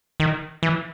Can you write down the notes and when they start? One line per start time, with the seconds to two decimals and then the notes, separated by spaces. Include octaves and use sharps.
0.20 D#3
0.63 E3